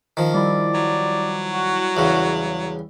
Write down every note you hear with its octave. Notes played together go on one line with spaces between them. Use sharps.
D#3 F3
G3 E4 D5
F#3
F#4
E2 C#3